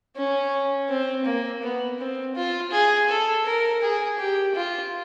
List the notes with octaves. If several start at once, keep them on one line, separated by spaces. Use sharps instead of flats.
C#4
C4
A#3
B3
C4
F4
G#4
A4
A#4
G#4
G4
F4